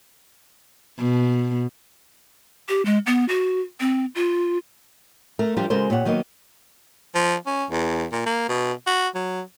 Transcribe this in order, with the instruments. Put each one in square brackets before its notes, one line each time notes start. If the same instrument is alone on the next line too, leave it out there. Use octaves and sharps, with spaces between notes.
[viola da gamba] B2
[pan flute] G4
G#3
B3
F#4
C4
F4
[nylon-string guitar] A3 A#4
F3 G3 D4 F4 G4 A#4
C#3 G#3 F#4 A4 A#4 C5
A#2 G4 C#5 F#5
D#3 F#3 A#3 B3 D#5
[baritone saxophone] F3
C#4
E2
A#2
A#3
B2
F#4
F#3